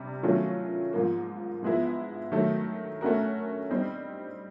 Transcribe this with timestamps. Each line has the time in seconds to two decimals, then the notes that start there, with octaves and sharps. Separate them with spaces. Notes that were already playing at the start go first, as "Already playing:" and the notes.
Already playing: C3 G3
0.23 D#3 F#3 A3 C#4 F4
0.93 G#2 F3 A#3
1.63 G#2 F3 G#3 B3 E4
2.32 D#3 F#3 A3
3.01 A3 C#4 F#4 A#4
3.70 G3 C4 D#4